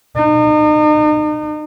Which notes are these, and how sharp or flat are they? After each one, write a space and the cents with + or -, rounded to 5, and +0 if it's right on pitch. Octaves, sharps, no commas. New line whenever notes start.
D#4 -40